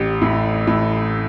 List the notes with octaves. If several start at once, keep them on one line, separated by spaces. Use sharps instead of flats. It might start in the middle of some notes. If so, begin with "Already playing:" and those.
Already playing: A1 G4
A2
A2